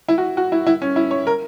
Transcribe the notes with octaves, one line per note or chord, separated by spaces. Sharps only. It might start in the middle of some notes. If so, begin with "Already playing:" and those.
E4
F#4
F#4
E4
E4
C#4
E4
C#5
A#4